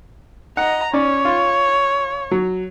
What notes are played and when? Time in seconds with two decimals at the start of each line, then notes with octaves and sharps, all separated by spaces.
0.57 D#5 F#5 A#5
0.94 C#4 C#5 D5
1.25 F4
2.31 F#3